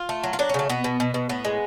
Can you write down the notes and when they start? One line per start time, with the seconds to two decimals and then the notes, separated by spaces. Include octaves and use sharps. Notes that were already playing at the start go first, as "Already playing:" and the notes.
Already playing: F4
0.09 A3
0.24 F#3
0.33 F4
0.39 F#3 D4
0.49 C#4
0.54 C#3 A3
0.69 B2 B3
0.84 B2
1.00 B2
1.14 B2
1.29 A2 B3
1.45 G#3